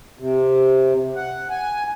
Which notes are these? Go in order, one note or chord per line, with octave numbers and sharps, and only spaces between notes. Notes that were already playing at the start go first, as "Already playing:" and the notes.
C3
F#5
G#5